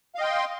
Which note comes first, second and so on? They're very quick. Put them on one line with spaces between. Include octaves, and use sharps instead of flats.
F5 D#5 G5 C6